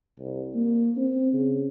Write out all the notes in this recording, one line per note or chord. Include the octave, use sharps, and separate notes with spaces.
C2
A#3
C4
C#3